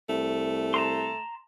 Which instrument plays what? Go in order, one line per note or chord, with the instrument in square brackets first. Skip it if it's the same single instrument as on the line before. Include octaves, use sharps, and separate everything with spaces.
[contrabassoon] C2 [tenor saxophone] A3
[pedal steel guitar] A5 A#5 C6